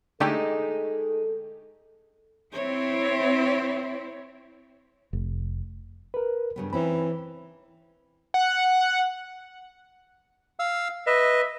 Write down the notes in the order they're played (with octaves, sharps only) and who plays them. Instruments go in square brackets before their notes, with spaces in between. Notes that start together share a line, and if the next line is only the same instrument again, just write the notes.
[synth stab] D3 A3 G4 [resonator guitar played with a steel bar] G#3 D#4 [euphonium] A4
[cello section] C4 E4 [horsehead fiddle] C#5
[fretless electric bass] F1
[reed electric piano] A#4 B4
[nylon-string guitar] G2 C#3 B3
[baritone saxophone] E3 [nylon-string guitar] C4 C#4 D#4 [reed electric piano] B5
[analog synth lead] F#5
[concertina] F5 E6
[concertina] B4 D#5 [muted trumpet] E5